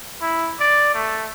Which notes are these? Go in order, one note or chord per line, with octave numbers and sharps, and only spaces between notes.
E4
D5
A3